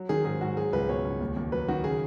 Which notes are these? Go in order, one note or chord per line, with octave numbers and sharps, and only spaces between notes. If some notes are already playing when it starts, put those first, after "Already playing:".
Already playing: F#3
D#3 G#4
G#2 G#4
G#2 F#4
F#3 G#4
C#2 B4
B2 C#5
C#2
D#2
D#2
F#3 B4
D#3 F#4
C#3 G#4